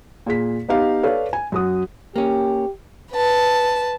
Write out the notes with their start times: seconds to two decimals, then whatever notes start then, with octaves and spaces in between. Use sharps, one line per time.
0.26 A#2 G#4 B6
0.69 B3 D#4 G4 F5
1.03 A4 B4 C#5 D5 F5
1.33 G#5
1.52 F#2 F#4 D#6
2.16 A#3 C#4 G4
3.12 B4 A5